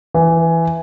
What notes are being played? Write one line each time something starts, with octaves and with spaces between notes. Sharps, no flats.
E3